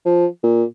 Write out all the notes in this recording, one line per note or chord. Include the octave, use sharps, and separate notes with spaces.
F3
A#2